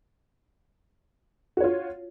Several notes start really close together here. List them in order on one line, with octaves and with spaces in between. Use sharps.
F#4 C#5 F4